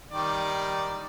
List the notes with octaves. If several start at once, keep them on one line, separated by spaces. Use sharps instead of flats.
D#3 G3 D5